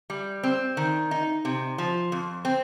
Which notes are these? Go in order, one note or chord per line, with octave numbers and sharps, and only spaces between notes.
G3
C4
D#3
D#4
C3
F3
F2
C4